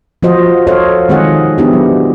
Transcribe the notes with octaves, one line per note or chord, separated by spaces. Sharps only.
F3 F4 F#4 C5 D#5
A4 C5 C#5 D#5 F5
D#3 G#3 C4 G#4 D#5 F#5
B3 D4 E4 G4
F#3